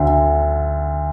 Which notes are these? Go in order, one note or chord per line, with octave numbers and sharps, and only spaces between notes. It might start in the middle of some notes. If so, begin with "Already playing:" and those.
Already playing: D2 D3